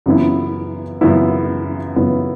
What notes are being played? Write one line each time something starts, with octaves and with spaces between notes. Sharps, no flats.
F#2 C#3 E3 B3 E4
F#2 C#3 E3 B3 E4
F#2 C#3 E3 B3 E4